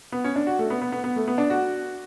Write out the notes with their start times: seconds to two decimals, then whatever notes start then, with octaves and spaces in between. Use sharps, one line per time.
0.12 B3
0.24 C#4
0.36 D4
0.47 F#4
0.59 A3
0.70 B3
0.82 B3
0.92 B3
1.04 B3
1.16 A3
1.28 B3
1.38 D4
1.50 F#4